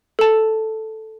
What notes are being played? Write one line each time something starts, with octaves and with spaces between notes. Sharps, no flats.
A4 A5